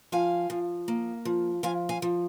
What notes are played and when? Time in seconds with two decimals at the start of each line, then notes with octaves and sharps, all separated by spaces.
0.12 F3 F5 G#5
0.50 F3
0.88 A#3
1.25 F3
1.63 F3 F5 G#5
1.89 F5 G#5
2.02 F3